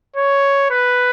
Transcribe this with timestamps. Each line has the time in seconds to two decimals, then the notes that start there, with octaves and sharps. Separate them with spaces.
0.16 C#5
0.71 B4